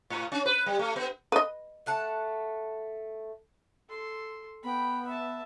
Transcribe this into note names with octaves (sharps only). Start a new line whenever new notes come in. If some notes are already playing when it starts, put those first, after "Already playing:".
A2
C#4
B4
G3
A3
B3
B4 D#5
A3 F#5 A5
A4 C6
B3 G5 B5
E5 A5